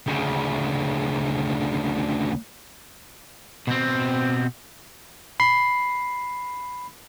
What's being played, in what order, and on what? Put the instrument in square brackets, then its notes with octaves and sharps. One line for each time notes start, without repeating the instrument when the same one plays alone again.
[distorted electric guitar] D2 C#3
[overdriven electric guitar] B2 C4
[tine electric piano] B5 C7